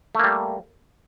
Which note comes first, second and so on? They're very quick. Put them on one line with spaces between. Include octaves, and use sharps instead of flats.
A3 A#3 G3